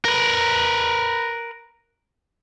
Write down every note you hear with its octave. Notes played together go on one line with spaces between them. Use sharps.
A#4 B4